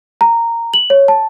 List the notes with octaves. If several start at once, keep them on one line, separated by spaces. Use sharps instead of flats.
A#5
F#7
C#5
A5